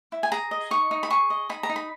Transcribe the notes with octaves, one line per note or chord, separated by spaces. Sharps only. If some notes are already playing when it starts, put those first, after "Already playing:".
E4
G#5
G#4 A#5
D#5
D#4 C#6
D#4
B5
G#4 C#6
D#5
D#4 B5
A#5
D#4
B5